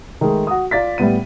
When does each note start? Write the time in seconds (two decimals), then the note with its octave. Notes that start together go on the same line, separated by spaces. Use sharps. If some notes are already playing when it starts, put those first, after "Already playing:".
0.21 D#3 G#3 A3
0.47 F#4 D#6
0.71 F4 D5 A6 B6
0.98 A2 G3 B3 D#7